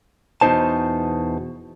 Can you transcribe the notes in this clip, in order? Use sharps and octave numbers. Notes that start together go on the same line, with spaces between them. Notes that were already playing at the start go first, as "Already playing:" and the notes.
E2 B2 A3 D#4 C5 A5